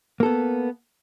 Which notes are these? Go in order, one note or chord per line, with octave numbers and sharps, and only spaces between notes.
A#3 B3 A4